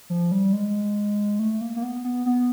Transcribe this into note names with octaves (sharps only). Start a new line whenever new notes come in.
F3
G3
G#3
A3
A#3
A#3
B3
B3
B3